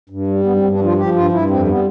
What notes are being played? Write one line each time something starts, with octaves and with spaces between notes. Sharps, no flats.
G2
G3
G2 B3
C4
G2
D4
F3
F4
F3 G4
G2 F4
G2 E4
F2 C4
G3 B3